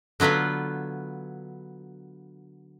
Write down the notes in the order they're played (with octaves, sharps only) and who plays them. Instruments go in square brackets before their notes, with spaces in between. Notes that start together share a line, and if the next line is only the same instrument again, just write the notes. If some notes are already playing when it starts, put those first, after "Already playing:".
[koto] D3 F#3 B3 F4 B4